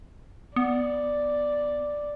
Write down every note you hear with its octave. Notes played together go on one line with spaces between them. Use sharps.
B3 D5